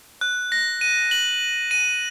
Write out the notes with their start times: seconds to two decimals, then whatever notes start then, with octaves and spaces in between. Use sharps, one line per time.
0.21 F#6
0.52 A#6
0.81 D#7
1.11 F#7
1.71 D#7